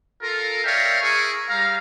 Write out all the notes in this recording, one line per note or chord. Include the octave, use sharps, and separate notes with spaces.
F4 A4 A#4
A#4 C#5 D5 E5 F5 G5
E4 G#4 A#4 G#5 C#6
G3 F5 A#5